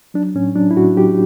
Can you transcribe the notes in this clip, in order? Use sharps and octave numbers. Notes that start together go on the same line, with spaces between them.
F#3 D4
A2 C#4
F#3 D4
E4
A2 F#4
F#3 G4